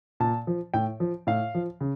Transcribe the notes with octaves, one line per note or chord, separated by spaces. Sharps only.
A#2 A5
F3
A2 G5
F3
A2 F5
F3
C#3